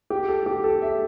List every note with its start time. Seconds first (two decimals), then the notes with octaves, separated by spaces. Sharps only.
0.10 G4
0.28 A4
0.46 G4
0.64 A4
0.82 E5